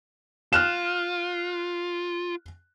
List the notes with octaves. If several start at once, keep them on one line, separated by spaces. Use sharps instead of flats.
F4 F6 F#6 E7